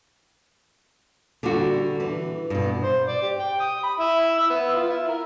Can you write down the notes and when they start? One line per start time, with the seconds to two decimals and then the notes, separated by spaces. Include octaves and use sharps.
1.43 D3 G3 F#4
2.00 E3
2.50 G2 B2
2.83 C5
3.07 D5
3.22 G4
3.39 G5
3.60 D#6
3.83 B5
3.99 E4
4.38 E6
4.50 B3
4.74 F4
4.90 E4
5.09 A#4